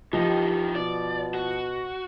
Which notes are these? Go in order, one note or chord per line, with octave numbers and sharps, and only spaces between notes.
E3 F3 D#4 G4
B2 D5
F#4